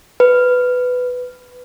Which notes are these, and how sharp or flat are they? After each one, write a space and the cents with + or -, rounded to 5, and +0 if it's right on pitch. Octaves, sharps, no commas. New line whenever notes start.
B4 +10